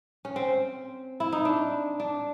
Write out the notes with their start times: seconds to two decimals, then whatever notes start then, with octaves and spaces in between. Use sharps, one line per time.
0.25 C#4
0.36 C4
1.20 E4
1.32 D#4
1.45 D4
2.00 D4